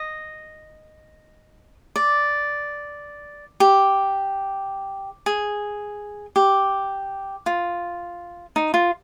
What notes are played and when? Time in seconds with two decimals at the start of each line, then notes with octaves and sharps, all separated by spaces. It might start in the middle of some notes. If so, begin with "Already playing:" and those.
Already playing: D#5
1.96 D5
3.60 G4
5.26 G#4
6.36 G4
7.46 F4
8.56 D#4
8.74 F4